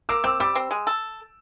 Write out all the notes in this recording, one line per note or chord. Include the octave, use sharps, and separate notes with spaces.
A#3 D6 E6
C4 D6 E6
G3 D6 E6
C4
G#3
A4